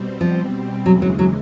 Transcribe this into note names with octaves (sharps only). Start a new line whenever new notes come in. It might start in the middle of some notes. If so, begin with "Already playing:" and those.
Already playing: B2 G3 C4
F3
D#2 C#3 E3 F#3 G#3
F#3
F#3